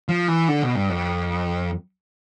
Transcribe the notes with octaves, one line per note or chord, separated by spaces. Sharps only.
F3
E3
D3
B2
G2
F2